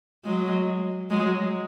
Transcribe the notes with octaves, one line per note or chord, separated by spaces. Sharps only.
F#3 G#3
F#3 G#3